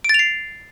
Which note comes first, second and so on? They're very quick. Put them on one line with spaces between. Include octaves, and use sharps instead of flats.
D7 A6 F7 C7